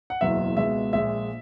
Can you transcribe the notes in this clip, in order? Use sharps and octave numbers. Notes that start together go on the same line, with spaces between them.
F#5
F#1 E2 B2 F#3 E5
C#2 B2 G#3 E5
A#1 A#2 G#3 E5